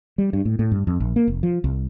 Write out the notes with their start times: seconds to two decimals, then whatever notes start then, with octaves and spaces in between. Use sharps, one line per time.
0.18 G3
0.33 G2
0.45 A2
0.59 A2
0.72 G2
0.87 F2
1.00 A#1
1.16 A#3
1.28 F1
1.43 F3
1.64 C2